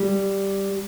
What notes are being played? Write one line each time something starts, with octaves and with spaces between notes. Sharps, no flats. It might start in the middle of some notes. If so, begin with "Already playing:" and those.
Already playing: G3